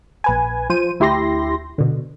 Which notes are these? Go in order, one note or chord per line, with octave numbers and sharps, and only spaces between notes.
A#1 B4 G#5
F3 C5 D#7
D2 E4 G4 C6 A#6
B2 D3